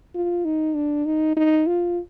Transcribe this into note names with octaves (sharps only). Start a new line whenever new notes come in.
F4
D#4
D4
D#4
D#4
F4